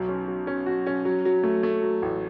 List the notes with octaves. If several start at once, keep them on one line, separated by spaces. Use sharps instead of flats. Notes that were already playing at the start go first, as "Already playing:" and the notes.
Already playing: B1 F#3
C#4
F#3
C#4
F#4
C#4
F#3
F#3
A3
A3
F#3
A1